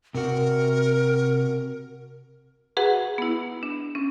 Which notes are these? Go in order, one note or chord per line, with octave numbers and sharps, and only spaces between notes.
C3 F#4 A#4
F#4 G#4 B4 F#5
B3 E4
D4
C#4